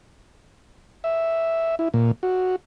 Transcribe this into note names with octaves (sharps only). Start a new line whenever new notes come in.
E5
E4
A#2
F#4